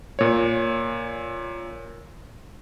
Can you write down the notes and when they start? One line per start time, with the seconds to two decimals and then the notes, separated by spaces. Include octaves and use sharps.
0.19 A#2 C#5